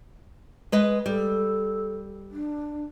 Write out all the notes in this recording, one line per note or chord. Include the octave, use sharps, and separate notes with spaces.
G#3 B4 D#5
G3 A4
D4